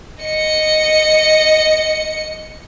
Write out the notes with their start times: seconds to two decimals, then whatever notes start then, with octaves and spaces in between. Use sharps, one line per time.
0.23 D#5 C#7